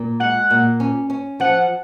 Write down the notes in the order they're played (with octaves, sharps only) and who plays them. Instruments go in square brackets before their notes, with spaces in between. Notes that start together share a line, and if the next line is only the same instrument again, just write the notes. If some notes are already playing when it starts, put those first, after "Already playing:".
Already playing: [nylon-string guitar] A#2
[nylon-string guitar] G#3 [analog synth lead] F#5
[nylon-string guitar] A#2
C#4
C#4
[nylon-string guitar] F3 [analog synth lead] F#5